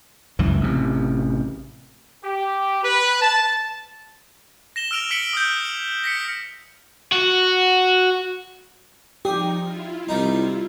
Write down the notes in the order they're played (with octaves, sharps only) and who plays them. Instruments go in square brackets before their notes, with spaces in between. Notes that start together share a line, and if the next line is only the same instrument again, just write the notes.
[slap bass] C#2 F#2 E3
A1 C3
[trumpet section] G4
B4
A5
[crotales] A#6 E7 G7
E6 F6 D7 F7
E6 B6 C#7 D7 F#7 G7
D#6 F6 G6
F7
A#6 B6 C#7
[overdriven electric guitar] F#4
[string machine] F3 D#4 [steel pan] G4 [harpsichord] G#4
[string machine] E4 F4
[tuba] C2 [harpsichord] G3 D#4